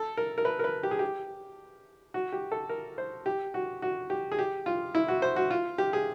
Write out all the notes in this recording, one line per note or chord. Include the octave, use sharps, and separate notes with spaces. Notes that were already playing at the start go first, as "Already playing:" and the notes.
Already playing: A4
A#4
A#4
B4
A#4
B4
G4
G#4
G4
F#4
G4
A4
A#4
C5
G4
F#4
F#4
G4
G#4
G4
F4
E4
F#4
C5
F#4
F4
G4
G#4